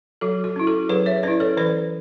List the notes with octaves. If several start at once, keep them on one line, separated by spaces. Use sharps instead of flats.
F#3 F#4 A4
F#4
C#4 E4
F#4 A4
F#3 G#4 B4
C#5 E5
C#4 E4 B4 D5
A4 C#5
E3 B4 D5